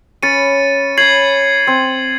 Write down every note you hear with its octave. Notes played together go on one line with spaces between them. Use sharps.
C#4 B4 A6 C#7 D#7
C#5 B5 G#6 C7 F#7
C4